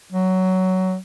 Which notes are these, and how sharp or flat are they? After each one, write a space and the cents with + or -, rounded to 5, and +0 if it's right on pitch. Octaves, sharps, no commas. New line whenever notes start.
F#3 +15